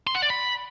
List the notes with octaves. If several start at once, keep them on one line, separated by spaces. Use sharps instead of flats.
C6
F#5
D5
B5